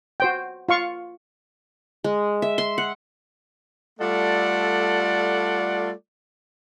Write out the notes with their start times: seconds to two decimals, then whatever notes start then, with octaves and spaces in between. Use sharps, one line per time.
0.20 F#4 C5 G5
0.69 F4 F5 C#6
2.04 G#3
2.42 E5
2.58 C6
2.78 F#5
4.00 G3 A3 F4 A4 D5 F#5